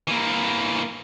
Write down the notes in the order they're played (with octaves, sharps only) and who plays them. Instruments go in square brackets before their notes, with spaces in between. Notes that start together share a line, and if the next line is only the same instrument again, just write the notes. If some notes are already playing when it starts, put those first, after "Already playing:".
[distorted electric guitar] E3 A#3